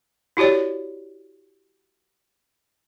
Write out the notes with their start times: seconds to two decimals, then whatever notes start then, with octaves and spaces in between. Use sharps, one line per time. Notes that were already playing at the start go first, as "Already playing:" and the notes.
0.37 E4 F#4 G4 C#5 D5